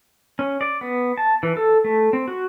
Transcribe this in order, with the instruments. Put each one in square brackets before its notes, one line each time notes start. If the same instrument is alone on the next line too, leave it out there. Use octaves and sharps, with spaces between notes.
[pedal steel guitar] C#4
D5
B3
A5
E3
A4
A3
C4
F#4